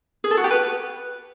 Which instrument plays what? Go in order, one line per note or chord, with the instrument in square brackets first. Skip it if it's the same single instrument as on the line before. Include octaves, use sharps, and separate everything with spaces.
[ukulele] G#4
A4
F#4
G4
B4